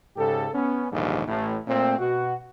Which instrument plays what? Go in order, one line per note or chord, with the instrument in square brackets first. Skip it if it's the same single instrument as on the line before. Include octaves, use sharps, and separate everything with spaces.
[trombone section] G#2 C#3 G4 A4
B3 C#4
A#1 D#2 G#2 D3 G3
A1 A2
A#2 A3 C4
B2 F#4